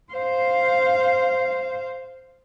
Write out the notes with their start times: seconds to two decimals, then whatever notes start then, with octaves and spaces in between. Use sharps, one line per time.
0.13 C5 F5